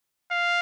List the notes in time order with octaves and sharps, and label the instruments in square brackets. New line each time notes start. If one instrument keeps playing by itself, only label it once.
[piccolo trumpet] F5